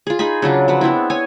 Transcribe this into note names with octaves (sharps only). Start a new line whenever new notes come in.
F4 G#4
D#4 G#4 G#5 B5
C#3 F#3 D4 F4
F3 F#3 B4
B3 C4 D4 E4
C#5 G#5